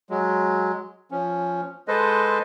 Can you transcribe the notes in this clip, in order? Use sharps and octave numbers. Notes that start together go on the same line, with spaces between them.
F#3 G#3
F3 C#4
G#3 A4 B4 C5 D#5